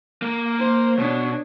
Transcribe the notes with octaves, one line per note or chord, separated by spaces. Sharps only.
A#3 A#4
C5
B2 D4 C#5